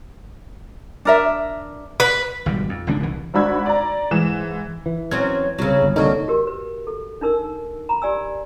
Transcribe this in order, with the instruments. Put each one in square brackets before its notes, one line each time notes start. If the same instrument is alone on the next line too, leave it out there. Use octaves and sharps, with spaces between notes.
[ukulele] D4 A#4 E5
[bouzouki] B4
[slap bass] G#1 B2 G3
F2
G#1 C#2 C4 D4
C2 E3
[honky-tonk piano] G#1 D4 F#4 B5 E6 G#6
D5 A#5
G#2 E3 E7
[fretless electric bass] E3
[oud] F#3 C4 C#4 [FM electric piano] G#6
[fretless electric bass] C2 [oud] C#3 F#3
[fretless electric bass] G1
[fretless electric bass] C2 D3 [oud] F#3 A#3 [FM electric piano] D#4 A4 C#5
[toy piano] F#4 G4 A#4
B4
A4
D4 D#4 A#4 E6
A#5 B5
G4 D5 G#5 E6